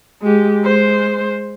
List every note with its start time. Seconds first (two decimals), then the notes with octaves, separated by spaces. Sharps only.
0.22 G#3 G4
0.64 G#3 C5